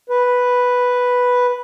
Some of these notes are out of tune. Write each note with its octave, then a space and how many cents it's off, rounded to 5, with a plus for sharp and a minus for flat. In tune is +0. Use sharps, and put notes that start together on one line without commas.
B4 +0